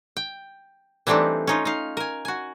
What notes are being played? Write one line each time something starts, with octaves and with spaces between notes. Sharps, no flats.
G5
E3 G3 A3 C4 D4 D#4
C#4 D#4 F4
D#4 F5
A#4 G#5
F#4 G#5